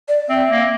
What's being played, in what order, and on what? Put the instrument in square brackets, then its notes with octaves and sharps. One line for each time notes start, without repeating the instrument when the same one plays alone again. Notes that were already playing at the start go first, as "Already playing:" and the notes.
[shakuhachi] D5
[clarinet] C4 [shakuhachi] E5
[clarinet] A#3